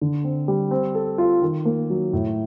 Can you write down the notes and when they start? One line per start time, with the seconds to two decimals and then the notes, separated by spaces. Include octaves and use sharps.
0.01 D3
0.24 C4
0.48 G3
0.71 C4
0.95 A4
1.18 F4
1.42 D#3
1.65 A#3
1.90 F#3
2.13 A2